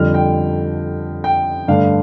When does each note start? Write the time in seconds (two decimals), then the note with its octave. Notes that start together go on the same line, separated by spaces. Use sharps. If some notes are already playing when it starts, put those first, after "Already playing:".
Already playing: F2 D3 G3 F6
0.14 G5
1.24 G5
1.68 G2 D3 A3 D4 F5